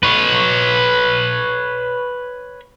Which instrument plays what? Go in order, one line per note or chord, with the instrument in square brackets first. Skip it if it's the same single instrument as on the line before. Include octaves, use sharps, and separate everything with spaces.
[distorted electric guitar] B4 C#5